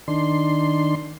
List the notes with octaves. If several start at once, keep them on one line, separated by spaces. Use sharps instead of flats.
D#3 D4 C6